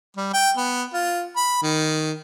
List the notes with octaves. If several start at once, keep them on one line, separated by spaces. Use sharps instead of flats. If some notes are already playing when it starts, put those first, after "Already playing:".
G3
G5
B3
F4
B5
D#3